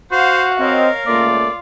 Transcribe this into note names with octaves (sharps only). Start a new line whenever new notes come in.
F#4 C5 F5 F#5
C4 A#4 C#5 D#5 F5
C#2 A3 A#3 F4 D5